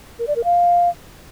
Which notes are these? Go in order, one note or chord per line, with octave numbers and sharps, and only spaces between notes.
A#4
D5
A#4
F5